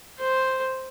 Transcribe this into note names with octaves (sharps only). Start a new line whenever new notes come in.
C5